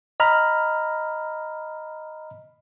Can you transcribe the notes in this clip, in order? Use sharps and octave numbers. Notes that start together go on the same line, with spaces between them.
D#5 A#5 B5 F6